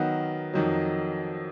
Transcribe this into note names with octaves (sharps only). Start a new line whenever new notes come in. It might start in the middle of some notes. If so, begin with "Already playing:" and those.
Already playing: D#3 F#3 B3 F#4 A#4
F2 D#3 F#3